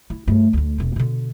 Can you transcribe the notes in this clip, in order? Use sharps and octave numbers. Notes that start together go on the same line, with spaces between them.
E4
G2 A3
D2 D4
E1 C4
B2 D3